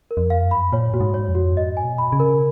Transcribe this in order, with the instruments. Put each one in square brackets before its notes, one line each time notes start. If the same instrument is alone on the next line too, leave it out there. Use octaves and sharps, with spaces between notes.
[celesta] A#4
[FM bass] F2
[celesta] F5
[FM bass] F#2
[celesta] B5
[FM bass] A#2 [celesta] C#5
[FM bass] A#2 [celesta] F#4
[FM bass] G#2
[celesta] C#5
[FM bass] F2
[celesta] F#4
[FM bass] G#2 [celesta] D#5
[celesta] G#5
[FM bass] B2
[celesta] B5
[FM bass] C#3
[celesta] A#4